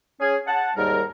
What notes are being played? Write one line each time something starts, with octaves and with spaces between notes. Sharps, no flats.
C#4 G#4
F#5 A5
D#2 G#2 G3 A#4